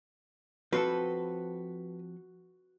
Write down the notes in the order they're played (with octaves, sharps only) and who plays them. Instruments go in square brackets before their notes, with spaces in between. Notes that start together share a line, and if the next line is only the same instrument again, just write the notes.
[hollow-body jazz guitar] F3 C4 A4 [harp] F#4 [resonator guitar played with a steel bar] B4